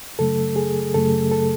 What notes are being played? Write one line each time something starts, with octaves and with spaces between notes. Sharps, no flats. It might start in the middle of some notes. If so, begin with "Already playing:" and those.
F#2 C#3 F#3 A3 A4
G#4
F#2 C#3 F#3 A3 A4
A4